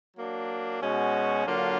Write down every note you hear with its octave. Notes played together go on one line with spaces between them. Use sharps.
F#3 A#3 D4
B2 G#3 C#4 F#4
D3 F#3 A#3 D4 F4